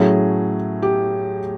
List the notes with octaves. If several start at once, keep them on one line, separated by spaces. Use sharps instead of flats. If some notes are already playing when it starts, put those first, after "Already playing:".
Already playing: A2 F#3 A3 C#4 G#4
G4